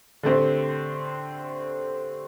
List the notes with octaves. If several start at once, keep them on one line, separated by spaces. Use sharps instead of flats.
D3 A3 C4 G4